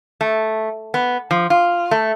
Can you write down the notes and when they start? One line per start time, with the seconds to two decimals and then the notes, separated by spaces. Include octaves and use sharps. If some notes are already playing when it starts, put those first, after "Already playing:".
0.21 A3
0.94 B3
1.31 F3
1.50 F4
1.91 A3